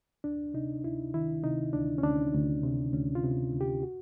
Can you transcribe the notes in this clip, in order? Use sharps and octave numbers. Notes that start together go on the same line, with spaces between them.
D2 D4
C3 D#4
D2 E4
D#3 E4
C3 D#4
D2 D4
C#4
D2 D4
D2
C3
D2 C#4
F4
C3
D2
G4
F#4